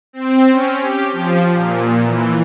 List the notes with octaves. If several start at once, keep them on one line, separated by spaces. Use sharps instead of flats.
C4
C#4
G4
F3
A#2
E3